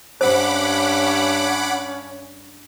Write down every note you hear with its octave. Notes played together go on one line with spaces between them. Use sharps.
G2 C#4 C5 F#5 B5 D6